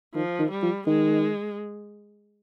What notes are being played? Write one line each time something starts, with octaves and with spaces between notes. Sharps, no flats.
D#3 F3
D#3
G3
F3
D#3 G#3